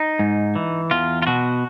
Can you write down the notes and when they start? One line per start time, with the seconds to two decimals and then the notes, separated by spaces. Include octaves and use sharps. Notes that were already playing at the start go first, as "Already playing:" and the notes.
Already playing: D#4
0.19 G#2
0.55 E3
0.91 E2 F4
1.22 F4
1.27 B2 F#4